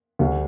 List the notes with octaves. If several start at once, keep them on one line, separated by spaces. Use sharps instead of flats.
D2 D3 G3